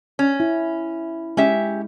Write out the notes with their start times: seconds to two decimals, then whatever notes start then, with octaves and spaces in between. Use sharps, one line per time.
0.19 C#4
0.40 E4
1.37 G#3 C#4 G4 E5